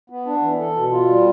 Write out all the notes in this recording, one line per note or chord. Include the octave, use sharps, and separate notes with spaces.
B3
D4
E3
A4
B2
F4
G3